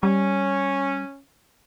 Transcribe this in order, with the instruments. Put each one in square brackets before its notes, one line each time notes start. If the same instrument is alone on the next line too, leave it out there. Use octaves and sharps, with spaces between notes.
[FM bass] G3 [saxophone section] C#4